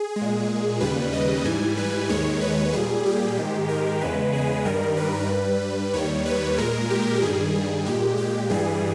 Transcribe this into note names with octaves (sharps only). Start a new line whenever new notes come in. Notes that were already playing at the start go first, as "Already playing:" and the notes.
Already playing: G#4
G#3
A#2
D#2 C#3 G3 B4
D#5
G#2 E3 G3 G#5
B4
D#2 D#3 G#3 C#5
B4
A#2 G3 G#4
G4
G#2 D#3 G#3
A#4
E2 C#3 G#3 B4
G#4
G2 D#3 G3 A#4
B4
G2 G3
D#2 D#3 G3 C#5
B4
A#2 G#3 A#4
G4
G2 D#3 G3 G#4
G#4
A#2 G#3 G4
G4
G2 E3 G3 G#4